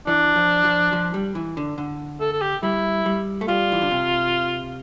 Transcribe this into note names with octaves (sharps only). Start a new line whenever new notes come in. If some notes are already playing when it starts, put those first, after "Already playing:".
E3 D4
F3
F3
F3
G3
E3
D3
D3
A4
A4
G4
G3 E4
G3
A3
G3 F4
E3
D3
C3